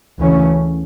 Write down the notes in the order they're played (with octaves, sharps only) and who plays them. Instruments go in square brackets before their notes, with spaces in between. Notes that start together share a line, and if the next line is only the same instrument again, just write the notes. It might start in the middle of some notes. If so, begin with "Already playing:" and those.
[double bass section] D2 C#3 E3 A3 C#4